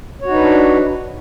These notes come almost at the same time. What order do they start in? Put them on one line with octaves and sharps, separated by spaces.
C#5 F#4 D#4 B4 D4